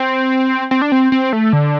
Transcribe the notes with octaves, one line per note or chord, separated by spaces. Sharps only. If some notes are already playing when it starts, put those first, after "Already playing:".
Already playing: C4
C4
D4
C4
C4
A3
D3